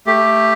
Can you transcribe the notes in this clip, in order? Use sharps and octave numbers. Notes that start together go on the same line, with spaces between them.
A3 G4